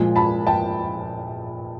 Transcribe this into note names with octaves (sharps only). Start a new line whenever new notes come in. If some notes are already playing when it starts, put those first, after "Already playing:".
Already playing: A#2 F3 G#3
A5 B5
G5 A5